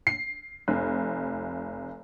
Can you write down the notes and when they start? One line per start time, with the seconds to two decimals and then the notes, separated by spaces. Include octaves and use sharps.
0.07 C7
0.68 F1